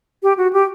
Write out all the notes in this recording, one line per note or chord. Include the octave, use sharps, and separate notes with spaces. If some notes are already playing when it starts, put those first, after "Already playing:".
G4
F#4
G4